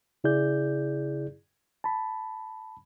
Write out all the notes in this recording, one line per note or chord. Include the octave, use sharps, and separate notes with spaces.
C#3 E4 G#4 D5 G6
A5 B5